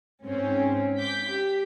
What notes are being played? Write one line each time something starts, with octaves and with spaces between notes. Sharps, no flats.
G#2 C4 C#4
D6 G6 B6
G4